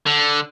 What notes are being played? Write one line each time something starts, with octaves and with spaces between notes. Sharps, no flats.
D3